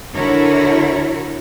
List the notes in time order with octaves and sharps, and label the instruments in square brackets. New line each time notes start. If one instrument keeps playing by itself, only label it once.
[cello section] D3 E4 F#4 A#4 C#5